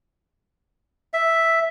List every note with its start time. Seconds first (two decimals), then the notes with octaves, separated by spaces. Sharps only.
1.14 E5